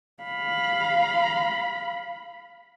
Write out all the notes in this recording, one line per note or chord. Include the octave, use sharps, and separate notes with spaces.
F5 B5